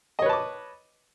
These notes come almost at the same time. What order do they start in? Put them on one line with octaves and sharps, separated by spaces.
D#5 C#5 B4 A5 D6